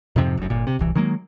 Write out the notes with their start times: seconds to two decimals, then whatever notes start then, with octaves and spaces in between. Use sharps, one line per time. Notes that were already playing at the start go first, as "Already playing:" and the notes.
0.16 F2 G#2 C3 F3
0.37 F1 F#2
0.50 G1 A#2
0.67 C3
0.79 D1 C2 E3
0.95 D#3 F#3 G#3 A#3